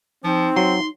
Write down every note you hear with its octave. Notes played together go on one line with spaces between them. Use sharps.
F3 C4 D#4
F#3 C6